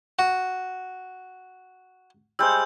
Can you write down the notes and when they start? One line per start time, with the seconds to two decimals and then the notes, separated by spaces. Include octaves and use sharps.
0.19 F#4
2.39 G3 G#3 C5 E6 G6